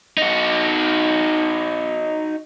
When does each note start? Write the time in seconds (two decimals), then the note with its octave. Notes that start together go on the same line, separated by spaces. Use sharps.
0.17 D#4 F#4